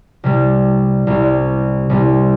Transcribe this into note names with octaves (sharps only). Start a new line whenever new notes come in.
C2 C3 G3
C2 C3 G3
C2 C3 G3